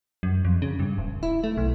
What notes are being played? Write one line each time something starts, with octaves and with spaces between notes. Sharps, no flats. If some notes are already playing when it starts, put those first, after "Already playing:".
F#2
F2
C#3
G2
D#1
E4
A3
B1